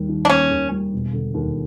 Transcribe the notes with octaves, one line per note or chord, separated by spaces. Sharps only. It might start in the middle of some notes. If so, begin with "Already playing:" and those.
Already playing: D#2 G3
D#3
D4
A#3 C#4
D#2
G3
E1
D3
D#2